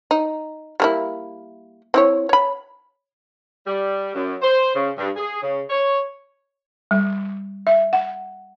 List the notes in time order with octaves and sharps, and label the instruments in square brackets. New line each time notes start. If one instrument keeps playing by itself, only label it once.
[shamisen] D#4
G3 A#3 E4
C4 E4 C#5
C#5 B5
[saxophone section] G3
F#2
C5
C#3
G2
G#4
C#3
C#5
[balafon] G3
E5
F#5